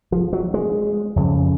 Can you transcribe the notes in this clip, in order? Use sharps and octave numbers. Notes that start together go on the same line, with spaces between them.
F3
F#3
G#3
F2 C#3